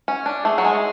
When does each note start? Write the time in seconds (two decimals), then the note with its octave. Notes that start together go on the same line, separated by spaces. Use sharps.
0.08 C#4
0.26 D4
0.45 A3 G#4
0.58 F#3
0.64 G#3